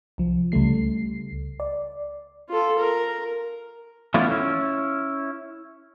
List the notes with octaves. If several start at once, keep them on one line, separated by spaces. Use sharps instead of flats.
C2 F3
C#2 C#3 G3 A3 C7
D5
F4 A4
A#4
E3 A3 B3 C#4 E4 F4
C#4 E4